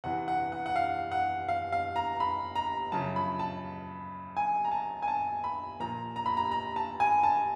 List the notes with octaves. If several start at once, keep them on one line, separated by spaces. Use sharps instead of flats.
E2 C3 E3 F#5
F#5
F#5
F#5
F5
F#5
F5
F5
A#5
B5
A#5
F#2 C#3 F3 A5
B5
A5
G#5
A#5
A5
G#5
A5
B5
A#2 F3 A#5
A#5
B5
A#5
A#5
A5
G#5
A5